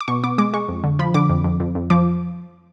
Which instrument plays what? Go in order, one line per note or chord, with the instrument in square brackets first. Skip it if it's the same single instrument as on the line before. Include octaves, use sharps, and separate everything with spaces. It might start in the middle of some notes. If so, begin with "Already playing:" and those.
[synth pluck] D6
B2 C#6
B3 D6
G#3 D6
G#3 C#6
F2
D3
F3 B5
D3 D6
F2
F2
F2
F2
F3 D6